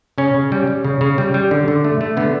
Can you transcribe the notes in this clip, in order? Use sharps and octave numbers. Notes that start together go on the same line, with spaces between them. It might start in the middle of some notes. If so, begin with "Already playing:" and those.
C#3 C#4
C#3
G3
G3
C#3
C#3
G3
G3
D3
D3
A3
A3
D3 B3